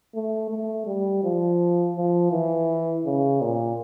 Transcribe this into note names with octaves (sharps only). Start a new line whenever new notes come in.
A3
A3
G3
F3
F3
E3
C#3
A#2